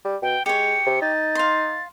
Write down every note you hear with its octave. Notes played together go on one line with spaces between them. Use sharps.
G3
B2 G5
G#3 G4 C#5 C#7
C3
D#4 A6
F5 C6